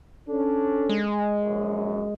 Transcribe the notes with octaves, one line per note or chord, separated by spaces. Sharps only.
C#4 D4 A4
G#3
A#1 F#2